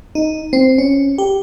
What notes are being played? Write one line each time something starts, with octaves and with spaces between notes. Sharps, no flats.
D#4
C4
C#4
G4